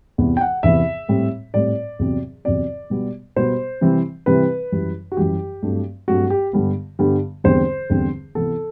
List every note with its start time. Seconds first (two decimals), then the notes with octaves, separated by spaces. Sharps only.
0.18 E2 C3 E3 B3
0.37 G5
0.41 F#5
0.63 E2 C3 E3 B3 E5
1.08 A2 G3 C4
1.54 A2 G3 C4 D5
1.99 E2 C3 F#3 C4
2.45 E2 C3 F#3 C4 D5
2.90 B2 G3 B3
3.36 B2 G3 B3 C5
3.81 C3 E3 G3 C4
4.26 C3 E3 G3 C4 B4
4.72 F#2 E3 G3
5.12 F#4
5.17 F#2 E3 G3 G4
5.62 G2 F#3 A3 C4
6.08 G2 F#3 A3 C4 F#4
6.30 G4
6.53 G2 D3 G3 B3
6.99 G2 D3 G3 B3
7.44 E2 D3 G3 C4 C5
7.90 E2 D3 G3 C4
8.35 C3 E3 B3 A4